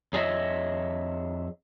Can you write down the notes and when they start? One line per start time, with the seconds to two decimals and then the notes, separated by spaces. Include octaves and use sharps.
0.13 F2 G#4 C#5 D#5 E5